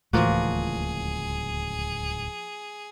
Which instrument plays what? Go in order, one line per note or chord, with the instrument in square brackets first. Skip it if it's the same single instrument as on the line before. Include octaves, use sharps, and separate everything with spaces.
[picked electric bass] D1 C#2 [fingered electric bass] A2 E3 [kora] F3 A#3 F#4 [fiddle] G#4